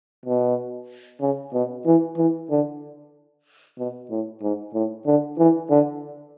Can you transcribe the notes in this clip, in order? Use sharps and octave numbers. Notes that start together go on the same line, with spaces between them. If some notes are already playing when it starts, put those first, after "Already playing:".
B2
C#3
B2
E3
E3
D3
B2
A2
G#2
A2
D3
E3
D3